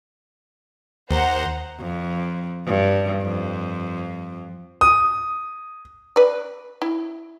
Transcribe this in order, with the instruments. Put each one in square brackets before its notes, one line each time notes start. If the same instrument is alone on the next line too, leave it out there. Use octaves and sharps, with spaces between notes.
[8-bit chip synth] D#2 [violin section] C5 F#5 A#5
[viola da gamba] F2
G2
F2
[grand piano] D#6
[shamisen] B4 D5
E4